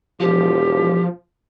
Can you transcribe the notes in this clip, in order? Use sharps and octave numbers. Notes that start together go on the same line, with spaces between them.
E1 F3 G4